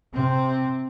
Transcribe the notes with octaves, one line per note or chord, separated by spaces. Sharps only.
C3 C4